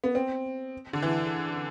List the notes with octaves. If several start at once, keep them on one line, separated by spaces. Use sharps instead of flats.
B3
C4
D3
E3